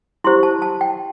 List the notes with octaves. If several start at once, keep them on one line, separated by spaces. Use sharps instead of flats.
E4 G4 C5 C6
A5
A5
G5